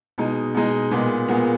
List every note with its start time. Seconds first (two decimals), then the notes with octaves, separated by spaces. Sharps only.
0.18 B2 G#3 D#4
0.54 B2 G#3 D#4
0.91 A#2 G#3 B3
1.28 A#2 G#3 B3